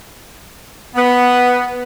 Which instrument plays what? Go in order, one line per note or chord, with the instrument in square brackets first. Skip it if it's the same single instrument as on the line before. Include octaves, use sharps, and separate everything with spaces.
[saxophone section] B3